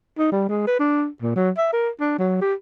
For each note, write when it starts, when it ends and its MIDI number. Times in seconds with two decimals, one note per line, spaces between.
0.18 0.31 63
0.32 0.45 55
0.49 0.65 56
0.67 0.75 71
0.79 1.07 62
1.22 1.35 46
1.36 1.50 54
1.57 1.69 76
1.73 1.89 70
2.00 2.15 62
2.19 2.38 54
2.41 2.54 67